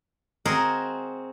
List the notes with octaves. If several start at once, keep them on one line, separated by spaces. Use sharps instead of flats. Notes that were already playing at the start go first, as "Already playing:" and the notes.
C4 F#4 G#4 A#4 D#5